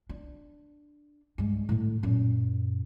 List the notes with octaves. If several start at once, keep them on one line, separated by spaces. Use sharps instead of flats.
D4
G2 G#3
A2 D3
F#2 A#2